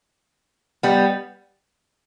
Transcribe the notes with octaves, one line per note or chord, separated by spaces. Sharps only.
G3 B3